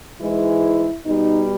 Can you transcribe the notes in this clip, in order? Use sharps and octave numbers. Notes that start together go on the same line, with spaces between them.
G#2 E3 G#3 E4
B2 G3 D#4